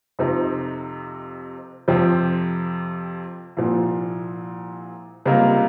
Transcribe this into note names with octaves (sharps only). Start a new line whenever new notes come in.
F2 C3 F3 C4 D#4
F2 C3 F3 C4 G4
C2 A#2 F3
C#2 C3 G3 A#3 F4